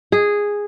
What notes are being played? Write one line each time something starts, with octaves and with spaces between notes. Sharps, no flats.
G#4